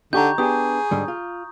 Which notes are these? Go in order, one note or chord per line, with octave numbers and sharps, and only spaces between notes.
D3 D#4 G4 A#5 C#6 G6
B3 D4 G4 G#4 D#6
G#2 D3 G3
F4